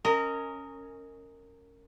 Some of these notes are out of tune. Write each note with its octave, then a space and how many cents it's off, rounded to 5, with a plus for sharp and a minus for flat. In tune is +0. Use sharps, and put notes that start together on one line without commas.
C#4 +0 A#4 -20 D#5 +10